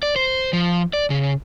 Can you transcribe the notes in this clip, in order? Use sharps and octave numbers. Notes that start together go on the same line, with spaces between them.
D5
C5
F3
D5
C#3